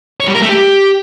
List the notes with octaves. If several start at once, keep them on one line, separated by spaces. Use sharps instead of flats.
C#5
G3
A#4
A3
G4